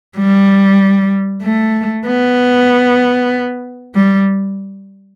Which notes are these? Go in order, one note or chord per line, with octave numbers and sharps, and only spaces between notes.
G3
A3
B3
G3